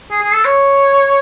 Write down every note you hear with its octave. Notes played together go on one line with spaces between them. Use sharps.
G#4
G#4
A4
C#5